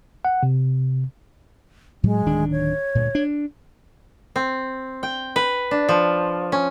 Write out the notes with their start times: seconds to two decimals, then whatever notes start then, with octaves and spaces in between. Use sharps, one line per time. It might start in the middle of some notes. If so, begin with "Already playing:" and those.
0.25 F#5
0.43 C3
2.03 A2 F#3 G#3
2.26 D1 D#3 D4
2.52 C#5
2.95 D2 G2 A#2
3.15 D4
4.36 C4
5.03 G5
5.36 B4
5.71 D4
5.89 F3
6.52 C#4